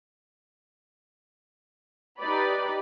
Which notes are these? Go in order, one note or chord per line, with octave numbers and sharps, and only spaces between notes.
D#4 G4 B4 D5 B5